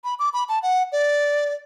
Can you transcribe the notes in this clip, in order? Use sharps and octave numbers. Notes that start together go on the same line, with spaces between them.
B5
D6
B5
A5
F#5
D5